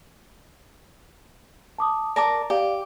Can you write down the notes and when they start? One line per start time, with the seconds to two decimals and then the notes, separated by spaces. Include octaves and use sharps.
1.79 A5 D6 D#6
2.16 A#4 D5 A5 D6
2.50 G4 D5 F5